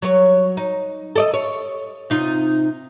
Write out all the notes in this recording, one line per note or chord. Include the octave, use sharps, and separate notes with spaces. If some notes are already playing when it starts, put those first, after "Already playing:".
F#3 C#5
D#4
A4 D5 D#5
C#5
C3 D#4 F4